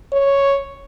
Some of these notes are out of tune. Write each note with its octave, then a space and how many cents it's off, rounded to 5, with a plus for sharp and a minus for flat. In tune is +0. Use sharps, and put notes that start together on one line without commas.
C#5 +0